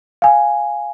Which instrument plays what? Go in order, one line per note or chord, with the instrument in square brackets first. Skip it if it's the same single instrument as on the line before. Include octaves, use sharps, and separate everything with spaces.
[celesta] F5 G#5